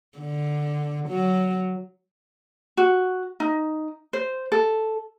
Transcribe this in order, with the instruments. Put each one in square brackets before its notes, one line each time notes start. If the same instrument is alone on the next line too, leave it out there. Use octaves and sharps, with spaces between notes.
[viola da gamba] D3
F#3
[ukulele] F#4
D#4
C5
A4